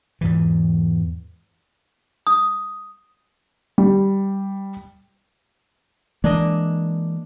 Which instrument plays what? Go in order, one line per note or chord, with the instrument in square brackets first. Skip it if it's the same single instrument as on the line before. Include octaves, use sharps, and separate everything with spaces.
[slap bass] E2 G#2 E3
[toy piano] D#6
[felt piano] G3
[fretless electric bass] E3 G#3 A#3 [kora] D4 D#5